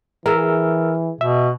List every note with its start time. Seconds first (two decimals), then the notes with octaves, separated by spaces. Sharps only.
0.26 E3 G#4 A#4 E5 F5 E6 F6
1.21 B2 E5